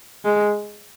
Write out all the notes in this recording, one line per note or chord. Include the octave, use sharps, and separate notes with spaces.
G#3